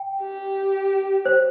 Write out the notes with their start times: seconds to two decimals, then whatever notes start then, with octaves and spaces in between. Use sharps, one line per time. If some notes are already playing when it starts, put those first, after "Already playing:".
Already playing: G5
0.22 G4
1.25 C5